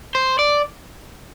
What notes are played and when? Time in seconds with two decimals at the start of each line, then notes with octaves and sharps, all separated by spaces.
0.15 C5
0.39 D5